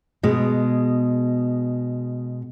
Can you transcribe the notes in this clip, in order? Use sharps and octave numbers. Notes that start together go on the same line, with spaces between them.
B2 G#3